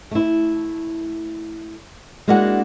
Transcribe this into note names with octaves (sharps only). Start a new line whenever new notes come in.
A3 E4
G#3 A#3 D4 E4 F#4 F#5